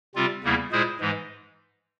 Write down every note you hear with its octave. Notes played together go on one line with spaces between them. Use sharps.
C3 G3 C4 F4
E2 C#3 G3 A#3 E4
A#2 G#3 E4 G#4 C5
G#2 E3 G#3